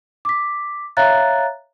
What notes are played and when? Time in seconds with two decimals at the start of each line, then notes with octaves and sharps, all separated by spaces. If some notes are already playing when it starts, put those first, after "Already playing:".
0.25 D6 B6
0.97 C#5 E5 F5 A#5 F#6 A6